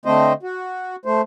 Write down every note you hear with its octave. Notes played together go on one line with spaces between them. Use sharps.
D3 A3 C4 C5 D#5
F#4
A3 C5